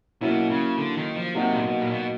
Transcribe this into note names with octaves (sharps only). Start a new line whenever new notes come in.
B2 F#3 A#3 C#4 E4
C#3
D3
D#3
F3
C3 F#3 A#3 D#4 F#4
A#2
B2
A#2
B2